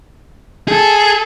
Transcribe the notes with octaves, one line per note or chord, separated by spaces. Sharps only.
G#4 A4